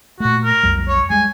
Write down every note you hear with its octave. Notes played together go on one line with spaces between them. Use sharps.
A#2 A3 F#4
A#4
B1 F2 G3
C#5
G3 G#3 G#5